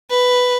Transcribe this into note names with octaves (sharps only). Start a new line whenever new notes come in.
B4